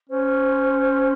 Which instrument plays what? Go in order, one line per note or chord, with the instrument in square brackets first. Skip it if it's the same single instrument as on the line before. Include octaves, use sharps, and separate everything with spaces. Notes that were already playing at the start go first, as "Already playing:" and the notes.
[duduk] C#4 [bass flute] C5